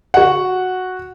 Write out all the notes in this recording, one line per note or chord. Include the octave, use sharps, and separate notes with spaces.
F#4 F#5